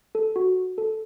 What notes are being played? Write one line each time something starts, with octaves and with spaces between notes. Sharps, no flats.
A4
F#4
A4